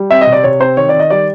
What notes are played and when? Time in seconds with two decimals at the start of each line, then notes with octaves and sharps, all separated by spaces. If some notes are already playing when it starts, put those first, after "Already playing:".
Already playing: G3
0.11 C4 E5
0.21 D#5
0.27 C3
0.33 D5
0.44 C3 C#5
0.60 C4 C5
0.77 D#3 C#5
0.89 D#3 D5
0.99 D#5
1.10 G3 D5